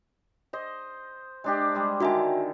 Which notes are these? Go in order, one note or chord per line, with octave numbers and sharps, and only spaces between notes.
C5 D#5
G#3 D4 G4
G3 G#3 D#5
D3 D#3 F#4 A4 E5 G#5